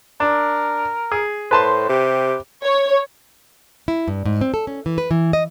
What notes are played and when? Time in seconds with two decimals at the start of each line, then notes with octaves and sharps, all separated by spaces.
0.20 D4 A#4
1.12 G#4
1.51 A2 B4 C5 A5 C6
1.89 C3 G4
2.63 C#5
3.88 E4
4.08 G2
4.26 G#2
4.41 C4
4.54 A4
4.67 C#4
4.86 E3
4.98 B4
5.11 E3
5.33 D#5